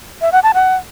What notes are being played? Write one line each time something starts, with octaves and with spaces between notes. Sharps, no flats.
E5
F#5
A5
F#5